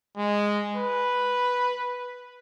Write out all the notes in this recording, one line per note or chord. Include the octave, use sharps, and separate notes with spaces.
G#3
B4